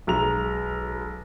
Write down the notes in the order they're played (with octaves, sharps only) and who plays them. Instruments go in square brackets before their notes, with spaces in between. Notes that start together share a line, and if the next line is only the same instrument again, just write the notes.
[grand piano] B1 G#3 A#5 F7